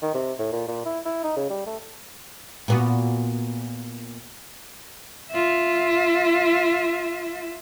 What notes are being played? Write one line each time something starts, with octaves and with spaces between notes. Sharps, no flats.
D#3
C3
A2
A#2
A#2
E4
E4
D#4
C#3
G3
A3
A#2 B3 F#4
F4 E5